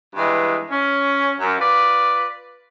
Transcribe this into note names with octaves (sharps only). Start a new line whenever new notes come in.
G2 E3 G#3
C#4
F#2
F4 B4 D5